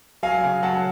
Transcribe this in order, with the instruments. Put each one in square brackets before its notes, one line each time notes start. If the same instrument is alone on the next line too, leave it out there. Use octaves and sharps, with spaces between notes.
[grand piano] F#3 F5 G#5
C#3
F#3 F#5 A5